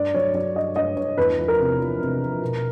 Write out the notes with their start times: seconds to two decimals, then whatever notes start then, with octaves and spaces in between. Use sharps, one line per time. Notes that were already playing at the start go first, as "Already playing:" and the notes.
Already playing: G2 D5
0.14 F#3 C#5
0.34 F#3 D5
0.56 G2 D#5
0.76 G2 D#5
0.96 G2 C#5
1.18 E2 B4
1.39 F3
1.48 A#4
1.59 C3
1.80 F3
2.00 C3
2.21 F3
2.42 B2